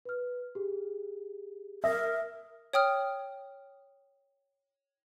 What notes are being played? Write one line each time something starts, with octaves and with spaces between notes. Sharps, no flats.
B4 F6
G4 G#4
A#4 E5 D#6 A#6
C#5 G5 D#6 F6